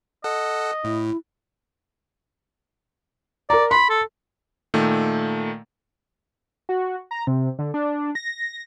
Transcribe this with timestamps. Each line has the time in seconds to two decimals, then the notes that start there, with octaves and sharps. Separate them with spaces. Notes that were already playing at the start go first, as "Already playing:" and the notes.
0.24 A4 D#5 F#5
0.84 A2 E4
3.50 A#4 D5 A#5
3.71 B5 C6
3.90 A4
4.74 A#2 D#3 A3
6.69 F#4
7.11 A#5
7.27 C3
7.59 D3
7.74 D4
8.15 A#6